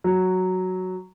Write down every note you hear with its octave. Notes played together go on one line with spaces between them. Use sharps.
F#3